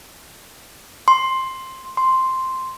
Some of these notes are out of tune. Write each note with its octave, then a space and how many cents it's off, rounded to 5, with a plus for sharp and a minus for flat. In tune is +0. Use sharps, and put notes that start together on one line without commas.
C6 +10
C6 +0